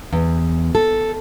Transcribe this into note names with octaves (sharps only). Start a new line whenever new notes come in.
E2
A4